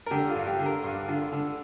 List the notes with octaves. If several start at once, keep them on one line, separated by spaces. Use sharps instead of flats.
A#4
D3 G4
F4
G2
G4
D3
A#4
G2
D3 F4
D3